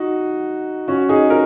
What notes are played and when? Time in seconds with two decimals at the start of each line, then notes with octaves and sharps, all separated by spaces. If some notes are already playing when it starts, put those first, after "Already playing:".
Already playing: D#4 F#4
0.88 C#4 F#4
1.09 D#4 G#4
1.30 A#4